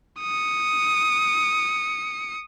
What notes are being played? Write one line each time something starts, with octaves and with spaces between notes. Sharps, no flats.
D#6 C#7